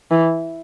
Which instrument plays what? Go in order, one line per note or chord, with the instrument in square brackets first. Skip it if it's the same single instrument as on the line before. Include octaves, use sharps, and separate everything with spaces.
[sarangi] E3